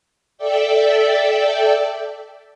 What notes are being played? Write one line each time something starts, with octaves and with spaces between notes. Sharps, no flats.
A4 D5 E5 G5